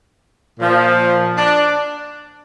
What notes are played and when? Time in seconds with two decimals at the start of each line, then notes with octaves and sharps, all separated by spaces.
0.59 A#2 F3
1.37 D4